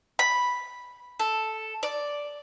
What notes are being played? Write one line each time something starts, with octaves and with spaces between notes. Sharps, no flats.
B5
A4
D5